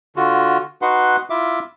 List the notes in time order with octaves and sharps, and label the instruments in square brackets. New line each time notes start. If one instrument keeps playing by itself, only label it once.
[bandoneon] D3 F4 F#4
D#4 F#4 B4 F#5 C6
E4 F4 E5 D6